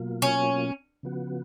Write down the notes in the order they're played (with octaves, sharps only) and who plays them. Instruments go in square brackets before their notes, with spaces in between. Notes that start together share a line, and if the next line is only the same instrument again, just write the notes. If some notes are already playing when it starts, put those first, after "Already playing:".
Already playing: [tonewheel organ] B2 F#3 A#3 F4
[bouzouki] C#4
[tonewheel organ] C#3 F3 B3 F#4